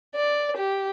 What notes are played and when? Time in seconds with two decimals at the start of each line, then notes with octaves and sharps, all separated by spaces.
0.15 D5
0.57 G4